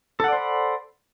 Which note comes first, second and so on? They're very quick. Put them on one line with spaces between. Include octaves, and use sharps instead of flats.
A4 F#5 D5 C5 B5